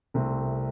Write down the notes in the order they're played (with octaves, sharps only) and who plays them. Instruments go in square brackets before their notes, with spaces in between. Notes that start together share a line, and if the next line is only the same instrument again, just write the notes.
[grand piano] C2 C3 A3 C4